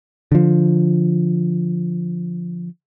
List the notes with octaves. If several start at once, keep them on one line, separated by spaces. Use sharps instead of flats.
D3 F3